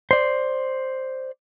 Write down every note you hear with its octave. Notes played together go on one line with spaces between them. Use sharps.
C5 D5